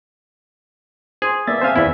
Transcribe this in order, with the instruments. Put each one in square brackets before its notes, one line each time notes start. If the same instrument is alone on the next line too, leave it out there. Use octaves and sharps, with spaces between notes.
[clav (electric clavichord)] G#4 [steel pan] C5
[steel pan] A#3 B3 D5 [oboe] E5 [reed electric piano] A6
[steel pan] C4 G#5 A5 [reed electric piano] C5 F5
[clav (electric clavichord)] E2 E4 [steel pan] B3